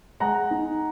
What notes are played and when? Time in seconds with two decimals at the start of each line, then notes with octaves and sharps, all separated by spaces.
0.20 G#3 F#5 A#5
0.51 D#4